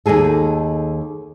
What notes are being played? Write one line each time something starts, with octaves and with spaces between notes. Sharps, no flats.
D#2 B2 D#4 G#4 A4